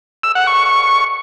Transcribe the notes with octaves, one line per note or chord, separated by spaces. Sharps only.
E6
F#5
C#6